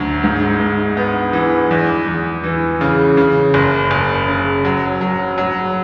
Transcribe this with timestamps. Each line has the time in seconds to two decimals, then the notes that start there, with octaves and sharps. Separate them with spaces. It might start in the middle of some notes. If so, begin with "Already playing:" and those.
Already playing: D2 F#3
0.24 G#2
0.60 G#2
0.97 B3
1.33 E3
1.71 E2
2.07 E2
2.44 E3
2.81 C#3
3.17 C#3
3.54 F#1
3.91 F#1
4.28 C#3
4.65 F#3
5.01 F#3
5.38 F#3